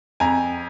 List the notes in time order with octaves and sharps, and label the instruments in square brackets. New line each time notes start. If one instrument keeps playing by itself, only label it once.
[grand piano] F2 G#5 A#5